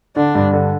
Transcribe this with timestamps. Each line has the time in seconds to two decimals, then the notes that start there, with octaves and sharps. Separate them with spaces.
0.16 D3 D4
0.35 G2
0.53 D3